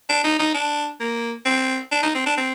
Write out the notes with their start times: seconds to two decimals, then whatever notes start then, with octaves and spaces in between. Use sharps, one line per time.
0.09 D4
0.24 D#4
0.39 D#4
0.54 D4
1.00 A#3
1.45 C4
1.92 D4
2.03 D#4
2.14 C4
2.26 D4
2.37 C4